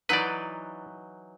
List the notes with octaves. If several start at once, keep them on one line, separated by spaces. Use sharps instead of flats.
E3 F#3 D#4 B4 D5